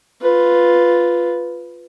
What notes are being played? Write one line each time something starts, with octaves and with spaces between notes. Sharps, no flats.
F4 B4